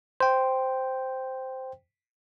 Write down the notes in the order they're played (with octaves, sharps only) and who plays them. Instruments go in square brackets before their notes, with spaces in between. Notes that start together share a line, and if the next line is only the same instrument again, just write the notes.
[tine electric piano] C5 G5